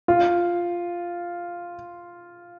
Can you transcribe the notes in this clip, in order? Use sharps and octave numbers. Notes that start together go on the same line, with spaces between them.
F4